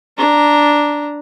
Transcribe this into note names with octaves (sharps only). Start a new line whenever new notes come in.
D4 A#5